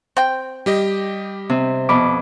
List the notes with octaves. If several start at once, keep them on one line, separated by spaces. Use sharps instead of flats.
C4 G5
G3 G4 D#5
C3
F2 B2 B5 D6